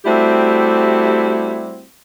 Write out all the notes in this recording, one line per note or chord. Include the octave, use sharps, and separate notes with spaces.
G3 A3 C4 E4 F#4 G4